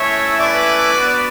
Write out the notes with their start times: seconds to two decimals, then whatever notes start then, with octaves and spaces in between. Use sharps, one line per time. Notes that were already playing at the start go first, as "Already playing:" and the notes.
Already playing: A3 C#4 E4 C#5 E5
0.40 B4 D5
0.94 B3 D4 F#4